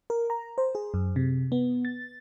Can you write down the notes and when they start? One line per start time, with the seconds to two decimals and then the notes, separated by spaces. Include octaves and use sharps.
0.10 A#4
0.30 A#5
0.58 C5
0.75 G#4
0.94 F#2
1.16 C3
1.52 B3
1.85 A6